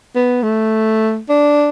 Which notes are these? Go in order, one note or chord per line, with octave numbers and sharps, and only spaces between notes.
B3
A3
D4